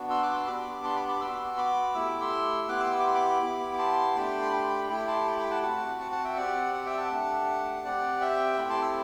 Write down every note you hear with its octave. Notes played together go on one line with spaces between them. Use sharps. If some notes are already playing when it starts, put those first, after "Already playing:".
Already playing: B3 D4 F#4
C6 E6
D6 F#6
C6 E6
B3 D4 G4 B5 D6
A5 C6
B5 D6
B5 D6
B3 F#4 C6 E6
B5 D6
A3 E4 G4 E6
D6
C6 E6
B3 E4 G4 D6 F#6
C6 E6
E6
D6
C6
B5 D6
B3 E4 G4
D6
A5 C6
A3 D4 G4 G5 B5
C6
G5 B5
A3 E4 G4 G5 B5
A5 C6
G5 B5
G5 B5
F#5 A5
C4 F#4 F#5 A5
F#5 A5
F#5 A5
E5 G5
C4 G4 D5 F#5
D5 F#5
E5 G5
F#5 A5
A3 D4 G4
C4 G4 D5 F#5
E5 G5
A3 C4 E4 G4 G5 B5
A5 C6
C6 E6